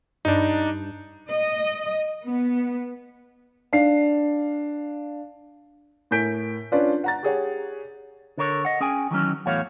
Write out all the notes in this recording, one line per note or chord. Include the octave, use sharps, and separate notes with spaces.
G2 D4 D#4
D#5
B3
D4 F5 C7
A2 A#4 G#5 G6 B6 D7
C#4 D4 F4 B4 D5
F#5 A#5 A6
G4 G#4 C#5 F#5
D3 A4 A#4 C#5
D#5 F#5
C#4 G#4 G5 G#5
D#3 E3 F#3 C#4
E2 A2 A3 F#4 C#5 F5